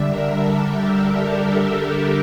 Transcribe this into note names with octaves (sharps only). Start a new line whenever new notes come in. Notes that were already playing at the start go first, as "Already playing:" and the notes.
Already playing: D3 G3 D4 E5
A#4
A4
G4
G4